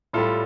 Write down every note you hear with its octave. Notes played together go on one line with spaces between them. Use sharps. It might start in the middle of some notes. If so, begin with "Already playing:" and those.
A2 G3 F4 A4